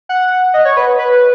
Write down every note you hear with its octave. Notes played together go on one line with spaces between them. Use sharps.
F#5
D#5
C#5
B4
B4